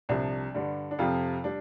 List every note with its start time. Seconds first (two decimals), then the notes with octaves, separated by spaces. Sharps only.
0.09 C2 C3 F3 D4
0.54 G2 D3 G3
0.91 D4
0.99 F2 C3 F3 F4
1.44 G3 D4